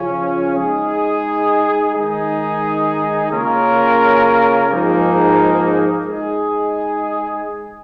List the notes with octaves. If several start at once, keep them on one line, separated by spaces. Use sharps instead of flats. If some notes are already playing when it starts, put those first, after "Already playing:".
Already playing: C#3 F3 C#4 F4
G#3 D#4 G#4
D#3 G#3 D#4 G#4
C#3 A#3 C#4 F4 A#4
G#2 F3 A#3 D#4 G#4
G#3 D#4 G#4